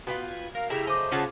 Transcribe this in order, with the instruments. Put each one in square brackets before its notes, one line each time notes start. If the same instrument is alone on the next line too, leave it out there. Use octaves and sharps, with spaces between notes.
[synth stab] B3 [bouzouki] F4 B4 G5 [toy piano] F#4
[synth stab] G#6
[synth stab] A#4 [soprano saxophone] F5
[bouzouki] C#3 A3 A#5 [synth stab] E4 E5 F6 [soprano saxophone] G4
[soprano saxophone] C5 [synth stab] D#5 [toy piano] G#5 D6
[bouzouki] C#3 F#4 A5 [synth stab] C#4 F4 G#4